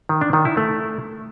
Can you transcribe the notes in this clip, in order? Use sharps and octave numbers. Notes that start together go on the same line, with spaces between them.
D#3
D4
D#3
E4
A3